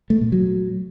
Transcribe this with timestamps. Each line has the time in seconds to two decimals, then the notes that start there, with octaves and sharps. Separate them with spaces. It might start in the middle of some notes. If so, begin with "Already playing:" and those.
0.10 A3
0.21 A#2
0.32 F#3